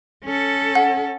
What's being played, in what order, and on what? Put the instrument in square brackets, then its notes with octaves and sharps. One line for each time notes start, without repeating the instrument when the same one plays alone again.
[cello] C#4 A4
[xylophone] F#5